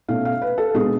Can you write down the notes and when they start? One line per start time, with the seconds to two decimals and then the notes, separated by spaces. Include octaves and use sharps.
0.09 B2 A3 C#4 F5
0.25 F5
0.42 B4
0.58 A4
0.74 B2 G#3 B3 D4 G#4